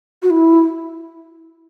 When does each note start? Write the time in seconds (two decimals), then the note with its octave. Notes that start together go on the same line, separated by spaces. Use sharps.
0.23 F#4
0.30 E4